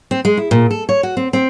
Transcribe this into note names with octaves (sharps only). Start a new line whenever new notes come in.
C4
G#3
E4
A#2
A4
C#5
F#4
C4
C4